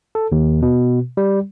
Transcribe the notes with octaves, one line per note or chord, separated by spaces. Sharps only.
A4
D#2
B2
G3